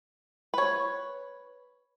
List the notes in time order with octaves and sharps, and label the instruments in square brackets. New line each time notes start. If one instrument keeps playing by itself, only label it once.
[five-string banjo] B4 C#5